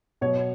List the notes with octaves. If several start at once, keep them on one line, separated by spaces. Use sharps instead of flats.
B2 F#3 C#5